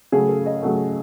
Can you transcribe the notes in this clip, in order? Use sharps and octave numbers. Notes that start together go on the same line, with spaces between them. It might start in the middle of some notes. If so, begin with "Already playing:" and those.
C#3 F#3 A3 G#4
A4
D#5
C#3 F#3 A3